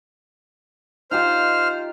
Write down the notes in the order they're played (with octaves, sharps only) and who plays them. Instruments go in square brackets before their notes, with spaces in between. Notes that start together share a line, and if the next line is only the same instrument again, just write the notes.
[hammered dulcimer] D#4 F4 G4 [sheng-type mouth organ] C5 F6